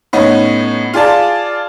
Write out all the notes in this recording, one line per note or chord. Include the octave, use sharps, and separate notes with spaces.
A2 B3 C#4 D#4
F4 G#4 D5 A5